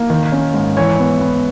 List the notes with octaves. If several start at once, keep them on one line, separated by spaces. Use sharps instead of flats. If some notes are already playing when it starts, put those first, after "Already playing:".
Already playing: A#3
D#3
C#4
G#2
E3 C#5
B3
B3